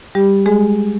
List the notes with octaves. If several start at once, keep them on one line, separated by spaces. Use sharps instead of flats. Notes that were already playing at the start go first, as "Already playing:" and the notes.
G3 G4
G#3 G#4